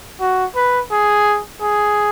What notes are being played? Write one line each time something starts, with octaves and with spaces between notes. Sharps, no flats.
F#4
B4
G#4
G#4